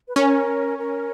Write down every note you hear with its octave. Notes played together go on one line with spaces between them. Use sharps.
B4
C#4 A#4
A#4